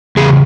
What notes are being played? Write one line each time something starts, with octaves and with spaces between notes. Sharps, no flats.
E2 C#3 G#4